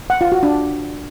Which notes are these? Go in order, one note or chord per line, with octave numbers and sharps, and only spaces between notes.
F#5
F4
F#4
D4